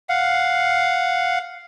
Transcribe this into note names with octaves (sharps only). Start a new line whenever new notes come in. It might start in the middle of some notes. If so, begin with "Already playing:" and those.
F5 F#5